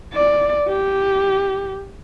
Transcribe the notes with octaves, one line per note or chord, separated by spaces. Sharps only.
D5
G4